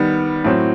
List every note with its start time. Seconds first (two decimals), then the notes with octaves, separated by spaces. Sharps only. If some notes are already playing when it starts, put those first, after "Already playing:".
Already playing: D#3 G3 B3
0.45 A2 F#3 C4